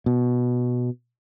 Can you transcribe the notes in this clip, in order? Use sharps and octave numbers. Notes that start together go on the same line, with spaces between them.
B2